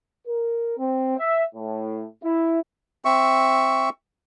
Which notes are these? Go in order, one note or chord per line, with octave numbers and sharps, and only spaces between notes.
A#4
C4
E5
A2
E4
C4 E5 C#6